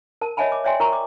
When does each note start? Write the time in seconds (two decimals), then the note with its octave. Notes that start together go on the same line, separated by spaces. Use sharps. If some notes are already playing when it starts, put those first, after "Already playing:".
0.21 A#4 A5
0.37 C#5 D#5 E5 G#5 A5 B5
0.52 D6
0.64 C#5 D5 E5 G5 G#5 C6
0.80 F4 A#4 A#5 C#6
0.93 D6